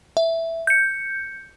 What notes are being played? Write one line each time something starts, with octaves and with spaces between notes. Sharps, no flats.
E5
G6 C#7